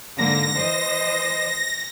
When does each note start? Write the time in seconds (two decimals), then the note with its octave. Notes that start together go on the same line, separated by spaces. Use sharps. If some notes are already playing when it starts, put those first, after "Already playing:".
0.18 G#2 D3 A#3 A#6
0.56 E3 C5 D#5